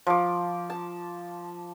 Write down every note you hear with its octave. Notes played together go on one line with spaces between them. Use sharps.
F3 D6
A5